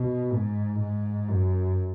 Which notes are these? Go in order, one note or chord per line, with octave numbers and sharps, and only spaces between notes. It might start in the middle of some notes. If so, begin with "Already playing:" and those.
Already playing: B2
G#2
G#2
F#2